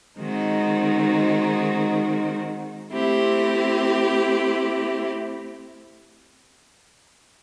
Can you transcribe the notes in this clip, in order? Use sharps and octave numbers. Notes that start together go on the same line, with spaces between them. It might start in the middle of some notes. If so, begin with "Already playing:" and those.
D#3 G#3 C4 D#4 F#4
A3 C4 E4 G4